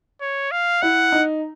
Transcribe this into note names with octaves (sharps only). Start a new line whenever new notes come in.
C#5
F5
E4 F#5
D#4